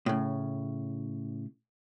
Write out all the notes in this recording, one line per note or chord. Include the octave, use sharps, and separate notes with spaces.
A2 C#3